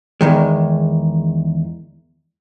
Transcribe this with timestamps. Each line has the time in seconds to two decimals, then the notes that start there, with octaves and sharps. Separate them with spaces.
0.21 E2 D#3 G#3